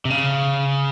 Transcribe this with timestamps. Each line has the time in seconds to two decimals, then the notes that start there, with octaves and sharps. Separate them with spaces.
0.05 C3
0.10 C#3